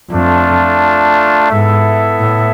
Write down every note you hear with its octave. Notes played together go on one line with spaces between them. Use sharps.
F2 A3 D4 F4
G#2 B3 E4 A4 E5
A2